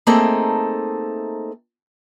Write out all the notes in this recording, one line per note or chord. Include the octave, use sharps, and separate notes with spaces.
A3 A#3 C4 D#4 G#4 A4